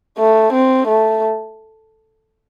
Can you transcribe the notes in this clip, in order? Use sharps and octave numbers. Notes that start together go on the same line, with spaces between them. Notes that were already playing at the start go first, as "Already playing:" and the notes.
A3
C4
A3